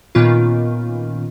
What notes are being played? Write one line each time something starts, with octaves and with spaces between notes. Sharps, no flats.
A#2 D#3 B3 C#4 F4